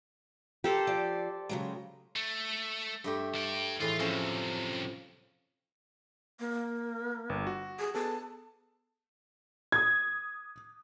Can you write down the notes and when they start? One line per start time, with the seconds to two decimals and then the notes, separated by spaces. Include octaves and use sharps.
0.64 G4 A4 A#4 C5
0.87 F3 D5
1.49 C#3 F#3 G#3
2.16 A3
3.04 G2 A3 G4
3.35 D4 G5
3.81 A2 E3 G#3 F4
3.99 F#2 C3 F3 C#4 A4
6.40 A#3
7.29 G1
7.47 F#4
7.79 G#4
7.94 B3 G#4 A4 A5
9.72 D#6 G#6